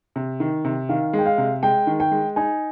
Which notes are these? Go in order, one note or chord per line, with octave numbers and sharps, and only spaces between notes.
C3
D#3
C3
D#3 F5
G#3
G5
F5
C3
G#3 G5
D#3
G5
G#3
D#4 G#5